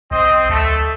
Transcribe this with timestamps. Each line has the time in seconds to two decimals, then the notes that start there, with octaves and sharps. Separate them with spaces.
0.11 B1 C4 D#5
0.49 D2 A3 A4